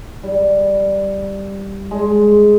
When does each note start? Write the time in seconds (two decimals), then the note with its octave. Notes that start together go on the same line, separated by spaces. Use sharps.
0.23 G3
1.91 G#3